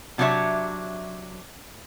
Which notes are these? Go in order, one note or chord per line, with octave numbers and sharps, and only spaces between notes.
C3 F#3 D4 E4 C#5 E5